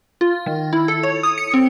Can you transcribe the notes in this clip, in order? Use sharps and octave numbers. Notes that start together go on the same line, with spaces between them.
F4
D#3
E4
A4
C#5
D#6
C#7
C4